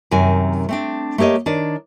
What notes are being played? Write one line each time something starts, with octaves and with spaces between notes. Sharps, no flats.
F#2 C3 D#3 G#5
A3 C4 D4
A3 A#3 G4 C#5 D#5
D#3 D4 C#5 D5